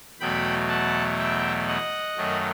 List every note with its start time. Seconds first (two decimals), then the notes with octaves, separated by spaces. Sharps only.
0.20 E2 B2 F#3 A3 G5 B5
0.69 F#5 A5
1.19 E5 G5
1.68 D#5 F#5
2.17 F#2 D#3 F#3 A3